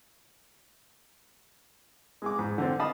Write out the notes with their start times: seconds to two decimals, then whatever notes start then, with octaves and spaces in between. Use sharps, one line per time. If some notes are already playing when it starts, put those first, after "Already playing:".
2.22 G#3 G#4 D6
2.39 G#2
2.58 D3 C4
2.79 D#5 F5 A5 B5 D#6